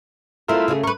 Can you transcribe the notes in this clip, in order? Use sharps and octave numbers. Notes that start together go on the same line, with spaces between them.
A3 C4 E4 F4 A#4
C#3 A3 G#4
A#4 B4 C#6